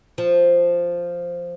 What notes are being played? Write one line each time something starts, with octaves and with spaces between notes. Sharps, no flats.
F3